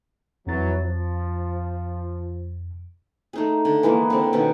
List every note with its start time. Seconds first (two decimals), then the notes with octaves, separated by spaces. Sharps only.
0.47 F2 E3 F#3 A6
0.83 F3
3.33 A3 D#4 G#4
3.65 D3
3.83 E3 G#3 A#3 B3
4.10 D3 C4
4.33 B2 D#3 C#4 D#4